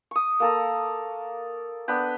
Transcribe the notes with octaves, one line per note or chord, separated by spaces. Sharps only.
C#6 D#6
A#3 A4 A#5
B3 D4 B4 G5